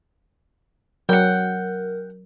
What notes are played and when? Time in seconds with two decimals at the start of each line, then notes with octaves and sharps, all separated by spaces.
1.09 F#3 A#4 F#5 G5